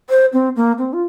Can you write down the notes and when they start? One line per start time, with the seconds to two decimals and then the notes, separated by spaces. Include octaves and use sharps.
0.10 C5
0.33 C4
0.56 A#3
0.78 C4
0.93 F4